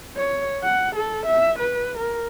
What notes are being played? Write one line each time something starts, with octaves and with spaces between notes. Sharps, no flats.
C#5
F#5
A4
E5
B4
A#4